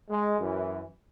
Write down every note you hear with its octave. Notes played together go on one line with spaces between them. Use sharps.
G#3
F#2 E3